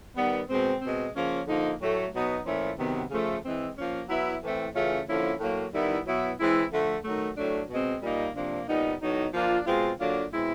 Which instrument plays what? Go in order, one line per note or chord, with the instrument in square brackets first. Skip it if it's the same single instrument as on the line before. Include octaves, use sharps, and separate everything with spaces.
[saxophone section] D#3 G3 B3
B2 G#3 C4
B2 G#3 C4
C#3 F3 A#3 C#4
D3 F3 A#3 D#4
A2 F#3 A3
B2 F#3 B3 D#4
A#2 F3 A3 C#4 E4
C3 D#3 F#3 B3
C#3 F3 A3
E3 G#3 C4
F3 A#3 C#4
F#3 B3 E4
A2 E3 A3 C4
C#3 E3 A3 C#4 F4
D3 F3 A#3 C#4 E4
A2 F#3 A#3
D#3 G3 B3 E4
B2 F#3 B3 E4
E3 G#3 C4 E4
D3 F3 A3
D#3 F#3 A3
A2 F#3 A3 D4
B2 G#3 C4
A#2 G3 A#3 D#4
C3 F3 A#3 D4
A#2 G3 B3 D#4
A2 F#3 B3 D#4
F3 A#3 D4 F4
B2 G#3 C4 F4
D3 F#3 A#3 D4 F4
B2 G#3 C4 E4